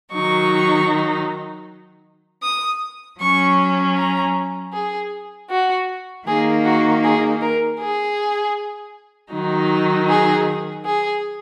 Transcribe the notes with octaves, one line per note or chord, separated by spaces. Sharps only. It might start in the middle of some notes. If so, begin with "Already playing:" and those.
D#3 F#3 D#4 C#6
D#6
F#3 C#4 C#6
A#5
G#4
F#4
D#3 A#3 D#4 G#4
F#4
G#4
A#4
G#4
D#3 F#3 D#4
G#4
G#4